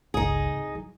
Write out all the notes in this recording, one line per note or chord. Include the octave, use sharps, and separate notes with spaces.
G1 C#2 D#4 G#4
C2
F#3